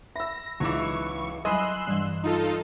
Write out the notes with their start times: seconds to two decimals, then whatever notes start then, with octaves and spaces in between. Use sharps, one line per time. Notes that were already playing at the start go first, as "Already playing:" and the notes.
0.16 E5 B5 E6 A#6
0.60 C#2 E3 F#3 D#4 C#6 D6
1.45 F#3 G3 D#5 G#5 B5 C6 E6 F#6
1.88 G2 E3 G3
2.23 D#4 F4 A4